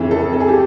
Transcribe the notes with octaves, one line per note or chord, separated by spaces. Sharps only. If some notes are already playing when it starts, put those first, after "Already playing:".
Already playing: F2 C#3 E3
A4
A4
G#4
G4